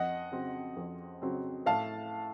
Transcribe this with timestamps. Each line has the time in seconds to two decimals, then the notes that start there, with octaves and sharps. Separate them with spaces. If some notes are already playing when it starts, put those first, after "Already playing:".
Already playing: F2 D#5 F#5
0.31 C#3 F#3 C4
0.77 F2
1.22 C#3 F#3 C4
1.66 A2 F5 A5